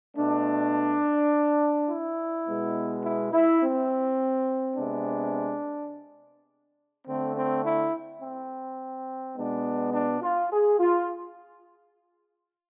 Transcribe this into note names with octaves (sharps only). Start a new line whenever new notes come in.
B2 A3 D4
E4
B2 G#3 B3
E4
E4
C4
C3 G#3 B3 D4
D3 A3 C4
C4
E4
C4
B2 G#3 B3 D4
D4
F4
G#4
F4